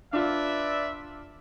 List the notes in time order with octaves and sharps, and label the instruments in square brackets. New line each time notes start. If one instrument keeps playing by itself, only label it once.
[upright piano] D4 F4 [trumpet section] B4 D5 E5